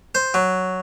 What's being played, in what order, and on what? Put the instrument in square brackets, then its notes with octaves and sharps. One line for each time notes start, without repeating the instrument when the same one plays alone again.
[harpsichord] C5
F#3